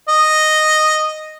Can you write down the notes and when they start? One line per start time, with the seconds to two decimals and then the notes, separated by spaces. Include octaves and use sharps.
0.09 D#5